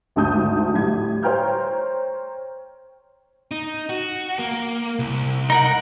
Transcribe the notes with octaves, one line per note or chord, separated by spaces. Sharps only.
G#1 D2 G#2 A5 D#6 G6
A2 G3 G#6
C5 C#5 G5 A#5 F6 G6
D#4
F#4
A#3
C2
D#4 A#4 F#5